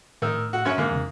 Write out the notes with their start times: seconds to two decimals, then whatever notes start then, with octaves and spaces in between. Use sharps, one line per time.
0.22 A2 D#3 E6
0.53 F#4
0.65 F#2 C#4 C#5
0.78 G#2 D3 A#3
0.91 E2 C#3